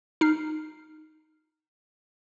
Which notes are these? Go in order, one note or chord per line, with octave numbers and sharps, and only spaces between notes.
D#4 F6 C7